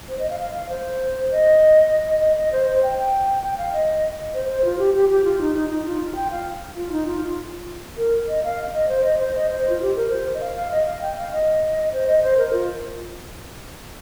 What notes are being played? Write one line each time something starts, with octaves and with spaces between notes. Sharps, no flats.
C5
D#5
F5
F5
F5
C5
D#5
D#5
D#5
D#5
C5
C5
G5
G5
G5
F5
D#5
C5
C5
F4
G4
G4
G4
F4
D#4
D#4
D#4
F4
G5
F5
F4
D#4
F4
F4
A#4
D#5
F5
D#5
C5
D#5
C5
D#5
C5
F4
G4
A#4
C5
D#5
F5
F5
D#5
F5
G5
F5
D#5
C5
D#5
C5
A#4
F4